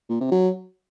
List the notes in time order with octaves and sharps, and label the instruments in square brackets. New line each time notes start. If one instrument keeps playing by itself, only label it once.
[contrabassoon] A#2
C3
F#3